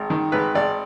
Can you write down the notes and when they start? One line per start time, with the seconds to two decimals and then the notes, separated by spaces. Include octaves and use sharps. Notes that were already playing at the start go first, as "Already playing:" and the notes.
Already playing: G#1
0.10 D#3
0.32 G#1 B4
0.55 G#1 D5